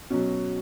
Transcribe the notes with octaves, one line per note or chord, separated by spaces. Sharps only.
B2 F#3 C#4